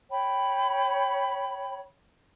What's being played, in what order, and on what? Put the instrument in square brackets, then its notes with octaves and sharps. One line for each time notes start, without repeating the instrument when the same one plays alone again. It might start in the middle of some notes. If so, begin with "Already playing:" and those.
[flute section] C#5 G5 B5